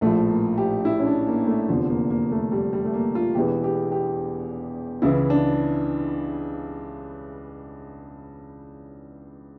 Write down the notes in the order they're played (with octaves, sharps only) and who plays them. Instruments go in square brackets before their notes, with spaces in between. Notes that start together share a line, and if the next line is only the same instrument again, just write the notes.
[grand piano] A#1 A2 F3 A3
A#3
G4
E4
C#4
D4
A#3
A3
F1 E2 D3 F3
A#3
A#3
A3
G3
G3
A3
A#3
F4
E1 E2 E3 G4
G4
G4
C#2 C#3 E3 E4
D4